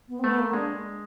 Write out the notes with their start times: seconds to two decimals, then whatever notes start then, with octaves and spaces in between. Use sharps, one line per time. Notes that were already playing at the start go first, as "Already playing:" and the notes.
0.09 B3
0.19 C4
0.23 A3 B3
0.39 A#3
0.54 G#3 D4